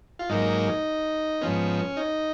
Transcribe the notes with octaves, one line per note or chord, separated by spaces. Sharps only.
F4
G#2 F#3 A#3 D#4
G#2 F3 B3 C#4
D#4